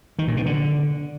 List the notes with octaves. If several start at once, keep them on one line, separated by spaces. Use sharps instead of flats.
D#3
A#2
B2
D3